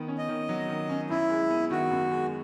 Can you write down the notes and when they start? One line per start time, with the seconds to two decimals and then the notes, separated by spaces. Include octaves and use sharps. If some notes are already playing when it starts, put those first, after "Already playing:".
Already playing: D#3 B3
0.08 C#4
0.18 D#5
0.29 D#3
0.49 F#3
0.69 D#3
0.89 C#4
1.10 F#2 E4
1.30 G#3
1.50 B3
1.71 D#3 F#4
1.91 F#2
2.11 G#3